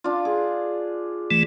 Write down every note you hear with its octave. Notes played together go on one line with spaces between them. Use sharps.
D4 F4
G#4
E3 A3